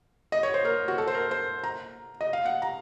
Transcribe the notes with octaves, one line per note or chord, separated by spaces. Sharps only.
D#5
C#5
C5
A#4
F#4
A4
C5
A#4
C5
A#5
D#5
F5
F#5
A#5